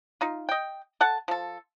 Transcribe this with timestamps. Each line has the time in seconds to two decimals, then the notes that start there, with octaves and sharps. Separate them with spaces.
0.21 D#4 F4
0.49 D#5 G5
1.01 A4 F#5 A5
1.28 F3 A4